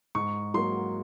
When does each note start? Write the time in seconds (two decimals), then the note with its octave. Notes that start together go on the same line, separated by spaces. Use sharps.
0.15 G#2 C#6
0.54 F#3 A#3 C6